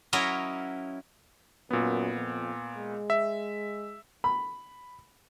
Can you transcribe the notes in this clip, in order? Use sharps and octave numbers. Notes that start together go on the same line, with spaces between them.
F#3 C#4 E4 A#4 C#5 D#5
F#2 A#2 B3
F2
G#3
E5
B5